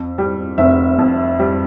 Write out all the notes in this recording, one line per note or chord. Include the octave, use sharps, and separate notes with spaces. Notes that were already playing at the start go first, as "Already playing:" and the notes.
Already playing: F2
G3
F1 E5
F2
G3